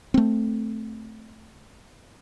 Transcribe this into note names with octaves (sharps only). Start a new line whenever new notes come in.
A3 C4